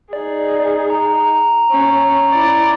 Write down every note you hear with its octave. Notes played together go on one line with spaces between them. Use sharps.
D#4 G#4 D5
A#5
C#4
E4 D5